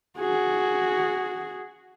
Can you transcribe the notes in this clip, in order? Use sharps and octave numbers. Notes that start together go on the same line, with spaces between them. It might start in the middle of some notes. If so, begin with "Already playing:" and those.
F#4 G#4